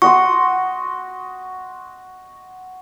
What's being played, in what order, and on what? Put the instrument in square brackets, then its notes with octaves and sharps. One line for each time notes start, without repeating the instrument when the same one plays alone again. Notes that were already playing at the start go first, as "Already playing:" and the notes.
[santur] F#4 D#5 C6 [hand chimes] C#6